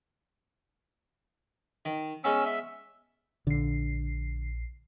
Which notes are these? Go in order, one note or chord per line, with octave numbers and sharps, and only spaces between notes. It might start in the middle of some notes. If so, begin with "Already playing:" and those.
D#3
G#3 B3 C#4 E6
E5
A#1 D3 C7